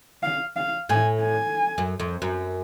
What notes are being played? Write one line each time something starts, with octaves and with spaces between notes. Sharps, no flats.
F5
F5
A2 G#5
G#5
F#2
F2
F#2